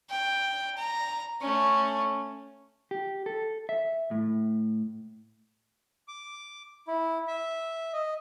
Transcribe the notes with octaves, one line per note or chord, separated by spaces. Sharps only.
G5
A#5
A3 C#4
G4
A4
E5
A2
D6
E4
E5
D#5